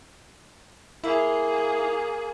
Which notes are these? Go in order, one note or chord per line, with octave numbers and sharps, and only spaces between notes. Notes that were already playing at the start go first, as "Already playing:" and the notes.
A#3 E4 G#4